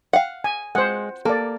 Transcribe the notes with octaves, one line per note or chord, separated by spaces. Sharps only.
F5 F#5
G#5
G#3 C5 F#5
A#3 A4 D5